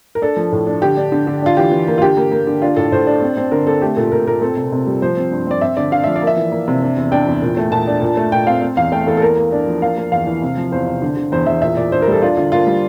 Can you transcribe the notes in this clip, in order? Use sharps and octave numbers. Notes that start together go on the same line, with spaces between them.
A#4
D4 A4
F3
A2
D4
D3 G4
D4
D3
D3
D4 F4
E3 G4
E3
A#3
F4
D3 G4
A#3
A#3
D3
D4 F4
A2 A4
A2 C5
D4
C4
C4
D3 A#4
C4 A4
A3 G4
A#2 A4
A#2 A#4
A#2 A#4
C4 A4
C3
C3
G3
F3 C5
C4
G2
C4 D5
C4 E5
D3 D5
D3 F5
F3 E5
D5
A#3
E5
E3
A#3
C3
D4
E2
D4 G5
E2
A#2
A3
A#2 A5
D4
A#2
A3
A#2 G5
C4 F5
C4
E2 F5
A3 G5
E2 A4
A4
A#3 A#4
A#3
D4
F3
A#3 F5
A#3
E2 F5
E3
C3
F3
E2 C5
C3
D3
D3
E2 C5
E2 E5
A#2 E5
A#2 D5
D4 C5
A#4
G3 A4
D4 F4
D3 F4
A#3 F4
G3